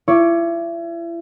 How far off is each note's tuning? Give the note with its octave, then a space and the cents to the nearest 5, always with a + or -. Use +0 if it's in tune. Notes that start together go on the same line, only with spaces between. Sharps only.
E4 +35 D5 +0 C#6 +0